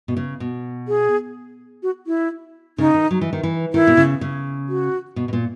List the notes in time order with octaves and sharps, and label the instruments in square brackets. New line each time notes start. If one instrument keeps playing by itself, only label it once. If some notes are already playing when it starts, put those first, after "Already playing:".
[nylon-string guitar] B2
C#3
B2
[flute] G#4
F#4
E4
[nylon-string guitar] C#3 [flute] D#4
[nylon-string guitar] D#3
F#3
E3
D#3
E3
[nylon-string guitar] D#3 [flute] E4
[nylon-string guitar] B2
C#3
C#3
[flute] F#4
[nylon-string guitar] B2
B2
A#2